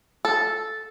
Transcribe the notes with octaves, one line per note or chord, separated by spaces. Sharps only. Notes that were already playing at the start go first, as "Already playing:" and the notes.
A4